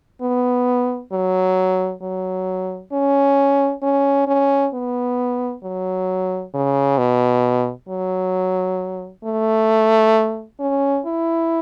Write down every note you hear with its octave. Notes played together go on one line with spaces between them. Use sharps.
B3
F#3
F#3
C#4
C#4
C#4
B3
F#3
C#3
B2
F#3
A3
C#4
E4